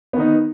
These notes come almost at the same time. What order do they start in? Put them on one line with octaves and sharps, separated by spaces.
B3 D#3 D#4